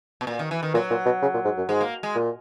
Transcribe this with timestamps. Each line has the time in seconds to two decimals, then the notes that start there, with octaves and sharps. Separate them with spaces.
0.21 B2
0.27 A#2
0.39 D#3
0.51 E3
0.63 D#3
0.74 A#2 F#3
0.90 A#2
1.06 B2
1.22 C#3
1.34 A#2
1.45 G#2
1.57 F#2
1.69 G#2 G#3
1.81 A#3
2.03 G#3
2.16 A#2